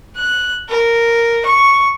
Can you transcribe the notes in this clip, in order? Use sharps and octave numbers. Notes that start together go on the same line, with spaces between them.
F#6
A#4
C#6